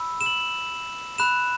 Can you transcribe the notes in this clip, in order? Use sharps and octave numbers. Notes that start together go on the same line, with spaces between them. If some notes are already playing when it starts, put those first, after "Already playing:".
Already playing: B5 E6
E7
F#7
B5 F#6 E7